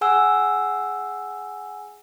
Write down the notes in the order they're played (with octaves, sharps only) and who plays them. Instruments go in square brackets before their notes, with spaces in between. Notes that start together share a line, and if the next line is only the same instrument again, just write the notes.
[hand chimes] G#4 F#5 G#5 E6